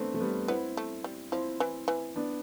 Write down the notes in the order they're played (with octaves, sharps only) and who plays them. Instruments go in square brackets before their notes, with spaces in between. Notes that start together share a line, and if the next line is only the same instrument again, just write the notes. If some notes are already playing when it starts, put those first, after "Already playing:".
Already playing: [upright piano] A3 B3 C4 D4
A3
G3 B3
[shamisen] B3 [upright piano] C4 E4
[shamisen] A3
G3
[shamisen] F3 [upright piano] C4 E4
[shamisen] E3
E3
[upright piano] B3 D4